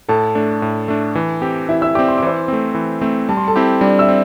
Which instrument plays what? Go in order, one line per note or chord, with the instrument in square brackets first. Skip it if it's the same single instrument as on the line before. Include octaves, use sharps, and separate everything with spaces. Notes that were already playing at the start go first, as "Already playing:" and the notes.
[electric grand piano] A2 [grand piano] A4 A5
[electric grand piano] A3 D4
A2
A3 D4
E3
C4 G4
[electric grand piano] E3 [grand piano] E4 E5
[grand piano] E5 E6
[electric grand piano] C4 G4 [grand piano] D5 D6
[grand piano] C6
D6
[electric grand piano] E3 [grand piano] C5 C6
[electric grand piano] A3 C4
E3
A3 C4
[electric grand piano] G3 [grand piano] A5
[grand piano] C6
A4 A5
[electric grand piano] C4 E4 G4
[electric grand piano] G3 [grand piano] D4 D5
[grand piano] E5 E6
[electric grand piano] C4